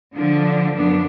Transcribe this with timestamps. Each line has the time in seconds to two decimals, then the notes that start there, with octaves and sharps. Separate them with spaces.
0.13 D3 F3 D4
0.74 F#2 B3 D4